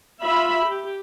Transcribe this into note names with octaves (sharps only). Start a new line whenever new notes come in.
F4 E5 B5
G4